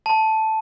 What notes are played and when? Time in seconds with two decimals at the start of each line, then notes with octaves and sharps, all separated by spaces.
0.06 A5